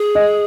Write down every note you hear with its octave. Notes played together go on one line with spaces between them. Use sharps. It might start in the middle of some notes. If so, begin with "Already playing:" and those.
Already playing: G#4
D#5